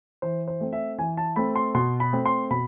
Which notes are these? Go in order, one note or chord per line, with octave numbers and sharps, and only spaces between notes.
E3 C5
C5
A3 C4
E5
E3 G#5
A5
A3 C4 B5
C6
B2 C6
B5
A3 C4
C6
B2 B5